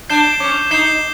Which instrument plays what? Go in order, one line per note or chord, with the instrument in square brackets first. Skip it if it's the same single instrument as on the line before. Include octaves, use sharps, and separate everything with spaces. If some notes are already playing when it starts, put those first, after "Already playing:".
[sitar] D4 [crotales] G6 C7 E7 G7
[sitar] C#4 [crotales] D6
[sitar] D#4 [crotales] G6 C7 E7 G7